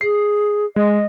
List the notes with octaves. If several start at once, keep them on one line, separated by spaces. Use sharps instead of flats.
G#4 C7
G#3 D#5